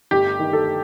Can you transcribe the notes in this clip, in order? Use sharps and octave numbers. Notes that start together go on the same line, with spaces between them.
G1 G4
D#3
A4